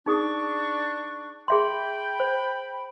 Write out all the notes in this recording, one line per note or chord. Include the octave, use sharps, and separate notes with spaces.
D4 D#4 G#4 C#6 D#6
G#4 E5 G5 B5 C6
C5